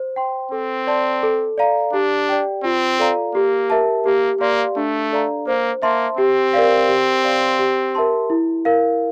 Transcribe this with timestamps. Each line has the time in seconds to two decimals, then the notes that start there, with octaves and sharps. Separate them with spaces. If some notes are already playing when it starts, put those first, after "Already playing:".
Already playing: C5
0.16 G5 C6
0.52 C4 A4
0.87 D5 A5 C6
1.23 A4
1.58 D5 F5 A#5
1.93 D4 G4
2.29 D5 G5
2.64 C4 F4
2.99 A4 D5 F5 A#5
3.34 A#3 G4
3.70 A#4 E5 A5
4.06 A#3 G4
4.41 A#3 D5 F5 C6
4.76 A3 D4
5.12 A4 D5 F5 A#5
5.47 A#3 C5
5.82 A#3 E5 A5 C6
6.18 C4 G4
6.53 A#4 D5 F5
6.88 G4
7.24 D5 F5 C6
7.59 G4
7.95 A#4 E5 A5 C6
8.30 E4
8.65 A#4 F5